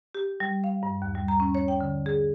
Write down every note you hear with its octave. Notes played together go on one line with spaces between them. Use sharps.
G4
G3
F5
G2
D#2
G3
A#5
C#4
C#5
G5
D3
G#4